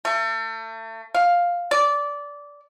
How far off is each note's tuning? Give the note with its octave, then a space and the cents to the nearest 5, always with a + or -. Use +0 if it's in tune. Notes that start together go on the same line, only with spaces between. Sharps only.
A3 +35
F5 +5
D5 -15